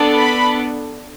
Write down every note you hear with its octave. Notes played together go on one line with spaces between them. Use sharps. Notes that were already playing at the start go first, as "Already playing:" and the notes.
Already playing: B3 D4 A4
B5